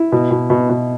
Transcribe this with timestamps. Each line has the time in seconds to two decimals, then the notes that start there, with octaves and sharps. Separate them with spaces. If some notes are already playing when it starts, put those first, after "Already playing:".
Already playing: E4
0.12 B2
0.31 B2
0.50 B2
0.69 B2